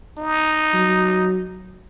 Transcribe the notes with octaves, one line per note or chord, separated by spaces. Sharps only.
D#4
F#3